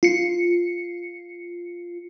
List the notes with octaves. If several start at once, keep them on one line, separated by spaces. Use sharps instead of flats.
F4 C#7